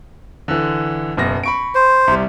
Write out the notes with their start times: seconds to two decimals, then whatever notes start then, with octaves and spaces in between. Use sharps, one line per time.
0.48 D3 E3
1.17 F#1 B2 A#6
1.44 B5 C#6 D7
1.75 C5
2.08 C2 G3